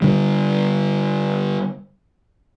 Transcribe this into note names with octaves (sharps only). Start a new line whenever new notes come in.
D3 G3